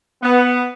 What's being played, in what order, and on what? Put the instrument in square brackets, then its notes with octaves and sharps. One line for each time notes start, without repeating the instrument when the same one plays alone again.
[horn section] B3